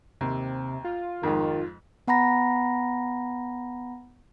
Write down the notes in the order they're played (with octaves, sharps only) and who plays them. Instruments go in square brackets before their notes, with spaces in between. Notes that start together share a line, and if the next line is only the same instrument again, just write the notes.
[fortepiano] D#2 [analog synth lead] C3
[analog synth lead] F4
[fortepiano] F2 G#2 [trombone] D#3
[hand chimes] B3 F#5 A#5 B5 A#6